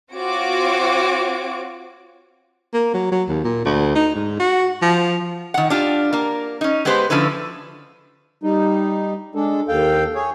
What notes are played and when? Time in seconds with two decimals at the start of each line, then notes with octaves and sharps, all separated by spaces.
0.14 C4 F4 F#4 C#5 D6
2.73 A#3
2.94 F#3
3.12 F#3
3.29 D#2
3.44 A#2
3.65 D2
3.95 D#4
4.15 G#2
4.39 F#4
4.82 F3
5.54 D#3 F#5
5.70 D4 F4 G4
6.13 A#3 A#4
6.61 C#4 D#4
6.85 G#3 B3 G4 B4 C5
7.10 D3 F3 C#4 E4 B4
8.43 G3 D#4
9.35 G#3 D4 A4
9.68 D#2 A4 F5 G5
10.15 G#4 C#5